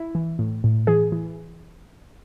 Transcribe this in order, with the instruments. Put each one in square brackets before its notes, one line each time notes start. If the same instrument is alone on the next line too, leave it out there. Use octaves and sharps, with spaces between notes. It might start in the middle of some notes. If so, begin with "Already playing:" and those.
Already playing: [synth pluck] E4
E3
A2
A2
E3 G#4
E3